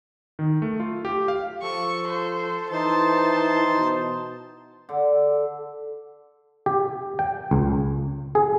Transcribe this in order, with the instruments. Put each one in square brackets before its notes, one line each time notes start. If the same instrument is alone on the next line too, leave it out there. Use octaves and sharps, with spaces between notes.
[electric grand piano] D#3
A3
F4
G4
F5
[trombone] F3 [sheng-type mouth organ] A4 [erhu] C#6
[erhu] C5
[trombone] E3 [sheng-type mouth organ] D#4 C5 C6 [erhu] A5
[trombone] B2
[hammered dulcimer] D3
[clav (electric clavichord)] G4
G5
C#2
G#4